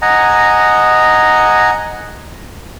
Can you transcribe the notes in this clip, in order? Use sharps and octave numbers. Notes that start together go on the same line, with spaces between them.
D#5 F#5 G#5 A#5